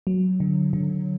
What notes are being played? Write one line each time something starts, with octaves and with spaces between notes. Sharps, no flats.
F#3
D3
D3